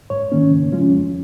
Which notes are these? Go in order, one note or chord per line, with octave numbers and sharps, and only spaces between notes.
G#2 C#5
D#3 A#3 C#4
C#3
F3 G#3 C#4 F4
F2